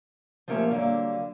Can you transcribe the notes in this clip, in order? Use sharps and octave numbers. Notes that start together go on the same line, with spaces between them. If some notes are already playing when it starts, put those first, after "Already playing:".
F3 A3 A#3 C#4 G4 A5
D3 F#3 G3 A#3